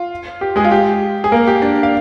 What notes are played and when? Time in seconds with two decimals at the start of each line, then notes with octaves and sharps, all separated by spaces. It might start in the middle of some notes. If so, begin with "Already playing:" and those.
Already playing: F4
0.41 G4
0.56 G#3 G#4
0.65 F4
0.71 G4
1.24 G#4
1.32 A#3 A#4
1.47 G4
1.62 D4 D5
1.83 F5